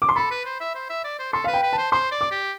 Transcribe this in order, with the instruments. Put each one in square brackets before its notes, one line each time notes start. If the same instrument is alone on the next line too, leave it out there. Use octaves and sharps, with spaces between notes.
[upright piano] D6
C6
[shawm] A4 [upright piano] B5
[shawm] B4
C5
E5
C5
E5
D5
C5
[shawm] A4 [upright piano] C6
[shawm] B4 [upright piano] F5
[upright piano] G5
[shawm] B4
[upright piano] A5
[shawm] C5
[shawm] C5 [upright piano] C6
[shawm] D5
[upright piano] D6
[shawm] G4